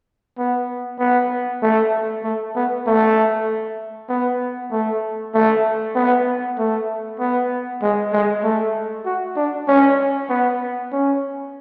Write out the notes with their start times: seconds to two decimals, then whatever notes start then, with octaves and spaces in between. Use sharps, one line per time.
0.38 B3
0.99 B3
1.62 A3
2.24 A3
2.56 B3
2.87 A3
4.09 B3
4.71 A3
5.34 A3
5.95 B3
6.58 A3
7.19 B3
7.82 G#3
8.13 G#3
8.43 A3
9.05 F#4
9.36 D4
9.68 C#4
10.29 B3
10.92 C#4